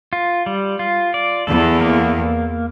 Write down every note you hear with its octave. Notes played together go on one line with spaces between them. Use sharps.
F4
G3
F4
D5
E2 A4
A#3